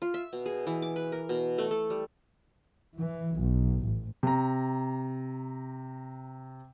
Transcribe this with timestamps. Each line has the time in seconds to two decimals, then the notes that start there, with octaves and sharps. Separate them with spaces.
0.02 F4
0.14 E5
0.33 B2
0.46 G#4
0.67 E3
0.82 D6
0.96 B4
1.12 A#4
1.29 B2
1.58 A3
1.71 A4
1.90 G3
2.96 E3
3.37 B1
3.81 A1
4.23 C3 A#5